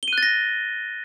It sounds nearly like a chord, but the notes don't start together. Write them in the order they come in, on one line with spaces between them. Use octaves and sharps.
G7 D#7 F#6 A6 A#6